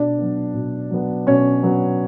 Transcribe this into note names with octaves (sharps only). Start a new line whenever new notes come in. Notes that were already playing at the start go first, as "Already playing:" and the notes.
Already playing: B2 D4 D5
F#3 B3
B2
F#3 B3
B2 C#4 C#5
F#3 B3